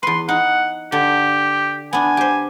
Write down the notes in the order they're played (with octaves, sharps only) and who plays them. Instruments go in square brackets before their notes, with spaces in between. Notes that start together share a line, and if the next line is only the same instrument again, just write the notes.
[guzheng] E2 B4 [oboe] C6
[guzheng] D#4 [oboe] F#5
[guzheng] D3 [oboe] G4
[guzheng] B3 D4 [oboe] G#5
[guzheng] G4 C5